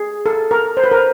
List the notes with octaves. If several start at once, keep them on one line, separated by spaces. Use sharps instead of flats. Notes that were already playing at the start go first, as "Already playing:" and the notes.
Already playing: G#4
A4
A#4
C5
B4
A#4